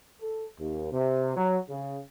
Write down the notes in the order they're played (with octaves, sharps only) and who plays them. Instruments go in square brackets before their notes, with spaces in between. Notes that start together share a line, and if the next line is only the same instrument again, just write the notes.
[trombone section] A4
D#2
C3
F#3
C#3